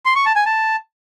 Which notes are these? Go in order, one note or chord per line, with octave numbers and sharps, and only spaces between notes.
C6
C#6
A5
G#5
A5